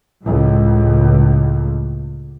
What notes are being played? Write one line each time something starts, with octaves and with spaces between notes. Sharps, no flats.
C#2 A2